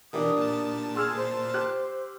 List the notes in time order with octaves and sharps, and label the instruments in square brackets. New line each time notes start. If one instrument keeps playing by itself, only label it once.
[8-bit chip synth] B2 E3 [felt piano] D4 G4 A#4 [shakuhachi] D#6
[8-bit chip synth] A#2 A5
[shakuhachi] G#4 [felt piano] C6 E6 F6
[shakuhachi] C5
[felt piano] G4 F#6